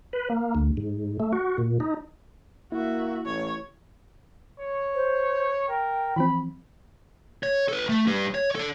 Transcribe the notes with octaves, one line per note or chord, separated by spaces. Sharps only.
B4
A#3
D2
G#2
A3
F#4
A#2
D#4
A#3 E4 F#4 E5
A1 C#5
C#5
C5
A#4 G5
E3 F3 C4 B5
C#5
A4 B4
A3
G3 B4
C#5
A4 D5